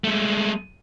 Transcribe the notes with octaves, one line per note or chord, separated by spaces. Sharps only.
G#3 A3